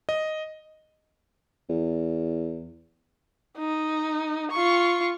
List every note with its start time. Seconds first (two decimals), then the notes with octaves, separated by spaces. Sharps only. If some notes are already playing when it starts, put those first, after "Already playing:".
0.09 D#5
1.69 E2
3.58 D#4
4.52 F4 C#6